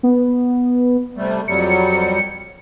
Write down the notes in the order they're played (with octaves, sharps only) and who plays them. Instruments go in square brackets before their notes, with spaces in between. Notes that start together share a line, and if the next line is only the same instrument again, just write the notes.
[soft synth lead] B3
[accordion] C3 G3 A3
[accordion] F2 F#3 G3 [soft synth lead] C#7